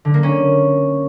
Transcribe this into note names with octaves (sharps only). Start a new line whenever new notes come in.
D3
A#3
C#4